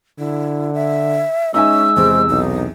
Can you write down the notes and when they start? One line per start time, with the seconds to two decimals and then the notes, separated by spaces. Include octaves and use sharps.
0.19 D3 E4
0.75 E5
1.54 G#3 C#4 D#4 E5 G#5 E6
1.96 E2 C3 C5
2.29 B1 D#4